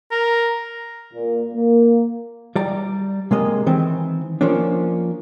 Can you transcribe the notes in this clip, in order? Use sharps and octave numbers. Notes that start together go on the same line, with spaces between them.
A#4
A#2
A#3
G3 D5 A#5
C3 G#3 A#3 D#5
D#3 E3 C4
F3 A#3 C#4 D4